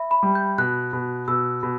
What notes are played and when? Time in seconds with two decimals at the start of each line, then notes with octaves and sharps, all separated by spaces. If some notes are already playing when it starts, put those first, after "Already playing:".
Already playing: E5 B5
0.11 B5
0.23 G3
0.35 G6
0.58 B2 F#6
0.93 B2
1.28 B2 E6
1.63 B2